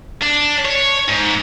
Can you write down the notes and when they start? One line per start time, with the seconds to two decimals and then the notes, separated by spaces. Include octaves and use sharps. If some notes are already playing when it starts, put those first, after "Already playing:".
0.22 D4
0.65 C#5
1.09 G#2